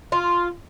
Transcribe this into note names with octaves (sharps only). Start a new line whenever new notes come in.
F4